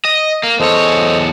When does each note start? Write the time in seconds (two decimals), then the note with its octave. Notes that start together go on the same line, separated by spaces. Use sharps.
0.05 D#5
0.43 A#3
0.60 E2 A4 C5 C#5 D#5